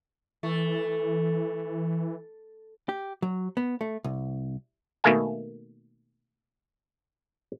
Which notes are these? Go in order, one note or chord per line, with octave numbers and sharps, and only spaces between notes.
E3 A3
G4
F#3
B3
A3
C2
B2 D#3 A3 A#3 F5 G#5